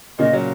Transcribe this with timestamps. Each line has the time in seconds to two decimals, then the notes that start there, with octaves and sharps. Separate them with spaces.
0.19 A#2 C#3 D#5
0.33 F#3